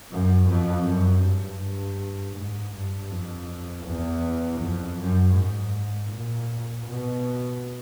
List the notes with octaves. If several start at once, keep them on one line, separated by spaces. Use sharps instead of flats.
F#2
F2
F#2
G2
G2
G#2
G2
F2
E2
F2
F#2
G#2
A#2
B2